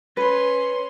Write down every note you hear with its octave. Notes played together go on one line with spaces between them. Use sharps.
C#4 B4 C6